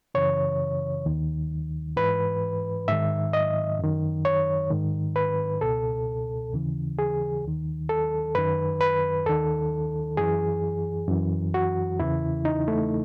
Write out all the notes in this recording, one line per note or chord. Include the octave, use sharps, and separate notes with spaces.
F#2 C#3 E3 C#5
D#2 D#3
G#2 E3 B4
G#2 D#3 E5
D#5
F#2 D#3
C#5
G#2 D#3
B4
C#2 B2 A4
D#2 C#3 E3
G#4
D#2 D#3
A4
F#2 D#3 B4
B4
D#2 D#3 A4
F#2 E3 G#4
F#2 E3
F#4
E2 C#3 E3 E4
D#4
A3